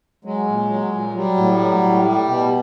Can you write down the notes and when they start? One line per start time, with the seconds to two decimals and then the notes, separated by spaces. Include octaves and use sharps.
0.25 F#3 G#3
0.48 A#2
0.70 F#3
0.92 A#2
1.14 F#3 G3
1.37 A2
1.59 F#3
1.82 A2
2.05 G3
2.27 B2